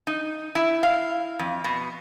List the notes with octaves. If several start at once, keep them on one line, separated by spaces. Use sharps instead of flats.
D#4
E4
F5
F2
B2